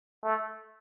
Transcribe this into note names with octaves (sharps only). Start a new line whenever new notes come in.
A3